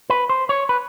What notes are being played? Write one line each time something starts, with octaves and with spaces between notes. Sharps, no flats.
B4
C5
C#5
B4